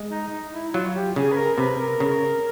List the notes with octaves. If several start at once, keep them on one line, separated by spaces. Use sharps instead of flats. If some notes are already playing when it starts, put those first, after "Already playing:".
Already playing: G#3
D#4
D#4
E4
F#3 F4
G4
C#3 G#4
B4
A#4
C3 B4
A#4
C#3